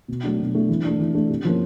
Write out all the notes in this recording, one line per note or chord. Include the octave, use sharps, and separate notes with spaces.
B2
F#3 A3 D4
B2
F#3 A3 D4
E3
A3 D4
E3
A3 D4
C3
F3 A#3 C#4